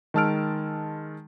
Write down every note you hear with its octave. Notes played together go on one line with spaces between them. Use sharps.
D#3 G#3 A5 E6 F6 D7